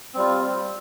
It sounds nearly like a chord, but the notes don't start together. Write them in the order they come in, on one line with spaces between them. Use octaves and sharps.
C4 G3 F4